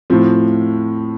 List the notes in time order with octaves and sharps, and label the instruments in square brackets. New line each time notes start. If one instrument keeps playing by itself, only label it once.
[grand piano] A2 F3 C4